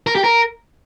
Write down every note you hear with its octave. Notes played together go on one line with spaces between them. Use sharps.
A#4
G4
A#4